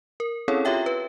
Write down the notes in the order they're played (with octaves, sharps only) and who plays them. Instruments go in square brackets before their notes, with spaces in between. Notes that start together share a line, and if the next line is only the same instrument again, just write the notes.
[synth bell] A#4
C4 C#4 E4 G#4 A4 C#5
F4 G4 C#5 E5 G5
B4